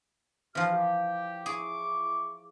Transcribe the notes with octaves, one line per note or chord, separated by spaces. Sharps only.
C3 E3 F3 F#4 F6
G4
E4 G#4 C#6 D6